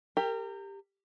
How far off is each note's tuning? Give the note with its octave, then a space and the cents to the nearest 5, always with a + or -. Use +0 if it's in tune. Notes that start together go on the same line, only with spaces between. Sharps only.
G4 +15 A#4 -30